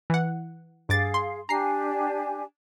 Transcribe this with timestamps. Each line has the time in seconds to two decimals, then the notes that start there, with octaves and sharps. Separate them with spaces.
0.10 E3 F#5
0.89 G2 G#4 F5 D6 A6
1.14 C6
1.49 D4 G4 G#5 A#5 C7